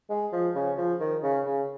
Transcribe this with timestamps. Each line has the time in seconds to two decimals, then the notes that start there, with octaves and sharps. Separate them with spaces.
0.09 G#3
0.32 F3
0.55 C#3
0.77 F3
1.00 D#3
1.23 C#3
1.46 C#3